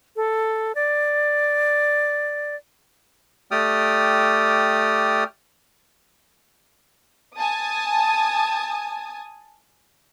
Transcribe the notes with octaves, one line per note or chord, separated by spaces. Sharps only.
A4
D5
A3 G4 D5 G5 D#6 F6
G#5 A5 D#6